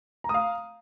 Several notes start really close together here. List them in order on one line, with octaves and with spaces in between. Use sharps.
A#5 D#6 F5